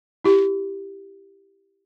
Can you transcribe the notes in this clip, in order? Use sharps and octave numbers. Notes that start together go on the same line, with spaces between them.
E4 G4